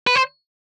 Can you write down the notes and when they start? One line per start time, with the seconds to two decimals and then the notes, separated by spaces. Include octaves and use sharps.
0.07 B4
0.15 C5